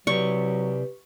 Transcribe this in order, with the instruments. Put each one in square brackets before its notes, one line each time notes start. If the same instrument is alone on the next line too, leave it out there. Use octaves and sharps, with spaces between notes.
[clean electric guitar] C3 D5 [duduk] F#3 [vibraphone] G4 B4 [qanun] C#6